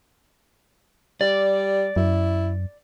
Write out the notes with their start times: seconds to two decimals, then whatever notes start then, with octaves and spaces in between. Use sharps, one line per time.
1.21 G3 D5
1.96 F#2 E4